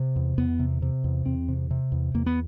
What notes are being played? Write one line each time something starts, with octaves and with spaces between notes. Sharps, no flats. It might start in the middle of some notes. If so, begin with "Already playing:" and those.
Already playing: C3
E2
E2 B3
C3
C3
E2
E2 C4
C3
C3
E2
E2 A#3
B3